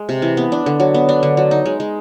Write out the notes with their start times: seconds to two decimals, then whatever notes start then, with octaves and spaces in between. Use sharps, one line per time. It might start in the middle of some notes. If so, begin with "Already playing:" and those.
Already playing: G#3
0.09 C3
0.22 E3
0.37 B3
0.52 D4
0.66 D3
0.80 F#3
0.94 B3
1.09 D4
1.23 D3
1.37 F#3
1.51 D#4
1.66 G#3
1.80 G#3